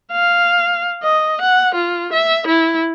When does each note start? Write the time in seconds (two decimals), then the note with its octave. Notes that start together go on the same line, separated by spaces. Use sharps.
0.12 F5
1.03 D#5
1.41 F#5
1.75 F4
2.13 E5
2.47 E4